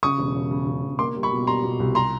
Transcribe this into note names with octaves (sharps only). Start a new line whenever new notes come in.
C#3 C#6 D#6
E1
E1
C#3
C#3
E1
A#3 C6 D6
G3
B5 C#6
B2
G3 A#5 C6
B2
C2
A#5 C6